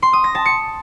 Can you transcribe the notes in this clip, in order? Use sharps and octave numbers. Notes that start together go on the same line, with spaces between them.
C6
D#6
A#6
A5
C#7